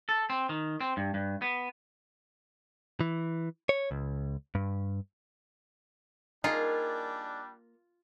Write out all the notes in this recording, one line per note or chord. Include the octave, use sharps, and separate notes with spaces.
A4
C4
D#3
C4
G2
G2
B3
E3
C#5
C#2
G2
G3 A#3 D4 D#4 F4 G#4 A#4 F5